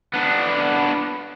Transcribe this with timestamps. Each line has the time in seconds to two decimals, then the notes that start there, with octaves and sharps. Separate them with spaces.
0.13 B3 D4